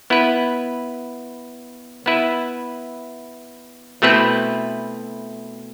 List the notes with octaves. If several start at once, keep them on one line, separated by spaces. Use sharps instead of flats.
B3 E4 B4
B3 E4 B4 E5
B2 A3 C4 E4 B4